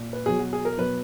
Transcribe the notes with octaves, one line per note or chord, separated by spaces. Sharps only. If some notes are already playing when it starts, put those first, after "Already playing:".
Already playing: A#2
B4
B2 F#3 G#4
F#4
G#4
A#4
B2 F#3 B4